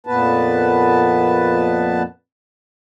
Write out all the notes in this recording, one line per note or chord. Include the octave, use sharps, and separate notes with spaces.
F2 A#2 B3 B4 A5